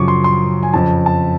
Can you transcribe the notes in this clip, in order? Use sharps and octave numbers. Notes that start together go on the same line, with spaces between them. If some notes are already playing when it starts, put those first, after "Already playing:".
Already playing: F#2 C#3 F3 C#6 D6
C6
C6
G#5
F2 C#3 F3 A5
A5